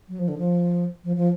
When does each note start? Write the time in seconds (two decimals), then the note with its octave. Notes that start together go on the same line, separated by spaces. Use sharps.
0.09 F#3
0.19 F3
0.28 D3
0.38 F3
1.04 F3
1.16 F3